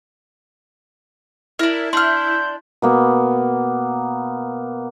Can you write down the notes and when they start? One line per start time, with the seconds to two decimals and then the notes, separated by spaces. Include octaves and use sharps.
1.59 D4 E4 A#4
1.93 D4 C6 F6 G6
2.82 B2 A#3 B3